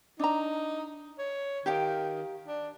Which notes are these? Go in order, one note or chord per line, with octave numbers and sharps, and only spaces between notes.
D4 D#4 A#5
C#5
D#3 G4 F5 G5
D4